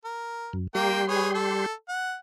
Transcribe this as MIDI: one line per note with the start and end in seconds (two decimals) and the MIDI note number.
0.05 0.51 70
0.53 0.67 42
0.75 1.66 55
0.75 1.03 58
0.75 1.66 67
0.75 1.03 79
0.75 1.66 84
1.08 1.29 68
1.08 1.29 71
1.08 1.29 73
1.34 1.73 69
1.89 2.15 78